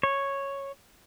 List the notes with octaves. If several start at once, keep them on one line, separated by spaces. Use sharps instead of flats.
C#5